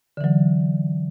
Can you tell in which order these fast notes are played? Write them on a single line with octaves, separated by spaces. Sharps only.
D3 E3 F#3